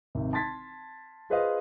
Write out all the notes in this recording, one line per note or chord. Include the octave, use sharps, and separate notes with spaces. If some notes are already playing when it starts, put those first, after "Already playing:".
G#1 C3
A5 C6 G#6 A6 B6
F4 G#4 B4 C5 D#5 F5